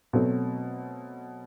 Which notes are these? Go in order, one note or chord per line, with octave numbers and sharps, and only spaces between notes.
B2 F#3 A3 C4